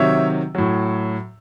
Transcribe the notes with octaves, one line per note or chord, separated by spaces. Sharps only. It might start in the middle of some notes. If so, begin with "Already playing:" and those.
Already playing: C3 D#3 F#3 C#5 E5
A2 F#3